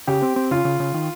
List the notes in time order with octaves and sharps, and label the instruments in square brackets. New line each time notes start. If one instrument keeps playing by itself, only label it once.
[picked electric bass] C#3 [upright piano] G4
[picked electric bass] C4
C4
[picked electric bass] C#3 [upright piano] F4
[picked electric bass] C#3
C#3
D#3